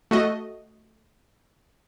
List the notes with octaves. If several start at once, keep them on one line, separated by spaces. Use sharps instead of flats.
A3 F#4 D#5